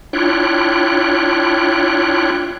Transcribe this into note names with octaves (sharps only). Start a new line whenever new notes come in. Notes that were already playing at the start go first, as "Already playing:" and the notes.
D4 E4 F4 C#5 G5 F#6